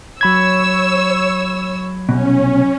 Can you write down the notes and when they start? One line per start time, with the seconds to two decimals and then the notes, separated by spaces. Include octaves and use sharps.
0.21 F#3 C#5 B5 E6 G#6
2.09 C2 B2 C#4